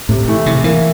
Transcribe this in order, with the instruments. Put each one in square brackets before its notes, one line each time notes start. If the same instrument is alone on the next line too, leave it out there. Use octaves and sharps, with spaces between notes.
[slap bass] A2 [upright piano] C3
[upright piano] E3 A3 E4
[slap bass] C3 [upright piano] E3
[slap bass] E3 [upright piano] A#3 E4